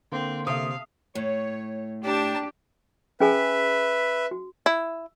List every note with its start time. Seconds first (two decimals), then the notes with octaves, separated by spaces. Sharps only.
0.12 D3 A#3 C4 C6
0.47 C3 A4 E5 F5 D#6
1.15 A2 C#5
2.04 D4 G4 A5
3.20 C#4 G#4 B4 E5 G#5
4.31 F#4
4.66 E4